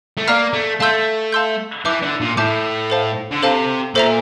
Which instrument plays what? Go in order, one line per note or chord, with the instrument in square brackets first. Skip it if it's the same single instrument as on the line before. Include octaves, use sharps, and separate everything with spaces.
[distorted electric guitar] A3
[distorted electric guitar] A#3 [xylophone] D5 F5 A#5 F6
[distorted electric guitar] A3
[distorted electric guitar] A3 [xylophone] F5 A5 C6 E6 G6
[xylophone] F5 A5 C6 E6 G6
[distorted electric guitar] E3 [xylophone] E5 A5 D6 G6
[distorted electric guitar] D3
A#2
[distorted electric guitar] A2 [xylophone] E5 A5 D6 G6
[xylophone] A4 C5 F5 A5
[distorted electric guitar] D3
[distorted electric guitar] C3 [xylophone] A4 C5 F5 A5
[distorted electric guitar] A#2 [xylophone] A4 C5 E5 A#5